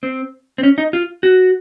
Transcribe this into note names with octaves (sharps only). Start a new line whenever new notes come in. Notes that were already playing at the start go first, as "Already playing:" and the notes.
C4
C4
C#4
D#4
F4
F#4